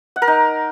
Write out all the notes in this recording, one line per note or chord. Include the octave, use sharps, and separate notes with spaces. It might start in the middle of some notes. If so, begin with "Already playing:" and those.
F#5
A#4
D#4